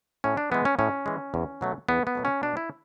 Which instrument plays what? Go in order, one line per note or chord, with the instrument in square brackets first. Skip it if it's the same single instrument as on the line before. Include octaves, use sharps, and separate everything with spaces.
[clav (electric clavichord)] A2 C#4
D4
E3 G#3 B3
C#4
A2 C#4
E3 G#3
E2
B2 F#3 A3
E2 B3
B3
B2 F#3 A3
C#4
B2 D4
E4